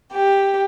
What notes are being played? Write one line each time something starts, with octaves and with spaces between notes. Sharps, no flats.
G4